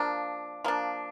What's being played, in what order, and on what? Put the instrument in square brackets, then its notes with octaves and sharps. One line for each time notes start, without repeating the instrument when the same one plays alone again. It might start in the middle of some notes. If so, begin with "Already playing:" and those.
Already playing: [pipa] F3 A#3 D4
F3 A#3 D4